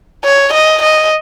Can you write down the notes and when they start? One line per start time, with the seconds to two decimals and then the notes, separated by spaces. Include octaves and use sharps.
0.24 C#5
0.53 D#5
0.83 D#5